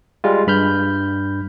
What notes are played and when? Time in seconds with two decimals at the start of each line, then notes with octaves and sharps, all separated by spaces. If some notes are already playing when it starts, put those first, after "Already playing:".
0.24 G3 G#3 F4
0.47 G2 B5 F6 G6